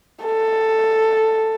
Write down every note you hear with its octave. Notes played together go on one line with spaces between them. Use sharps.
A4